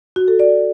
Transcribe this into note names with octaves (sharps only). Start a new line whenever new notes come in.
F#4
A4
D5